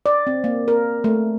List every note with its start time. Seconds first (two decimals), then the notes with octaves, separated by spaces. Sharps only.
0.06 D5
0.27 C4
0.44 A#3
0.68 A#4
1.04 A3